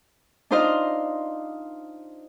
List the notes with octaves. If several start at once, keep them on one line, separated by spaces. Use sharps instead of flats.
D4 D#4 F4 C5 D#5 F5